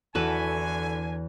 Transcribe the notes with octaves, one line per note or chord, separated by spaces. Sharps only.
E2 D3 E4 F#4 A4 B4 G#5